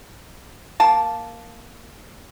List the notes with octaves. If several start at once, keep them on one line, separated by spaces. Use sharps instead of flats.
A#3 A5